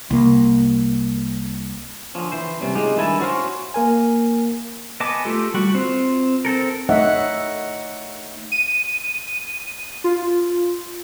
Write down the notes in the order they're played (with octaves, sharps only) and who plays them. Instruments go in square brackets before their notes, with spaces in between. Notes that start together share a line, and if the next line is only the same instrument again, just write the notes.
[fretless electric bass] C2 A#3
[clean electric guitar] D3 F3 C#4
E3 C5
C3 G3 C#4
G#3 D#4 F4 G4
G2 D#3 E4 G#5 A5
C#4 F#4 C5 F5
[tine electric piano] A#3 A#4 G#5
[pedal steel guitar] B3 D#5 G#5 A5 D6
A3 F4 G4 A4
G3 F#4
C4 F4
C4 A4 A#4
[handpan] A3 D#4 C#5 D#5 E5 F#5
[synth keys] D#7
F4